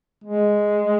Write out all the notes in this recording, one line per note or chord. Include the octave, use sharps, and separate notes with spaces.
G#3